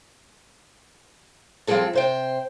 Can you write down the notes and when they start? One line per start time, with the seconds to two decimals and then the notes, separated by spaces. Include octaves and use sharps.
1.67 F3 G3 C4 G#4 A4
1.93 C3 C5 G5